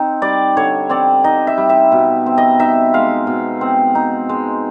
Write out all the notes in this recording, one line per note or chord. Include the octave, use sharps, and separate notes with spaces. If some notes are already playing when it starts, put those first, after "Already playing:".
Already playing: C4 D#4
G3 D5
D3 C#5
C4 D5
D#4 D#5
E5
G3
E5
B2
C4
D#5
D#4 E5
G#3 F5
B2
C4
D#4
G#3